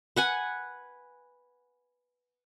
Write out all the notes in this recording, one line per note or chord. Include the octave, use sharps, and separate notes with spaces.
B4 F#5 G#5